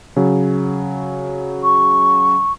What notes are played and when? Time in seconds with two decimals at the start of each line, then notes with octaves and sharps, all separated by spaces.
0.16 C#3 F#3
1.63 C#6